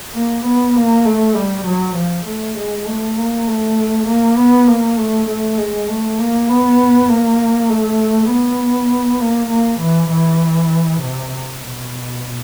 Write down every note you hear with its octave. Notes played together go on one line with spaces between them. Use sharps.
A#3
B3
A#3
A3
G3
F#3
F3
A3
G#3
A3
A#3
A3
A#3
B3
A#3
A3
A3
G#3
A3
A#3
B3
A#3
A3
B3
A#3
A#3
E3
E3
C3
B2